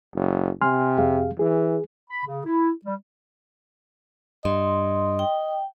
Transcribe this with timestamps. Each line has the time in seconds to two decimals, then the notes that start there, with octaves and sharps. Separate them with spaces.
0.15 F#1
0.61 C3 G#5 C6 F6
0.98 F2 G#4 F5
1.39 E3 G#4
2.10 B5
2.26 C#3
2.46 E4
2.85 G3
4.45 G2 D#5 C6
5.19 G5